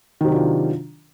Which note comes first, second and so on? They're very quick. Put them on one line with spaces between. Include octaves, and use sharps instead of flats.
D#3 C3 F#3 D4 F4